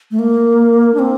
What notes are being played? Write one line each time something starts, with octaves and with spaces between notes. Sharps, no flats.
A3
A#3
D4
C4